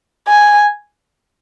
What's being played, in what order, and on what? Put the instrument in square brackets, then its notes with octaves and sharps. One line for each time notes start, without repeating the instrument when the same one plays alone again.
[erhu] G#5